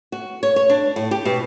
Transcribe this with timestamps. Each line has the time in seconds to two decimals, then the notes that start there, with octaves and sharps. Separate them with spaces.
0.12 F#4
0.43 C#5
0.56 C#5
0.70 D4
0.96 A2
1.11 G4
1.25 B2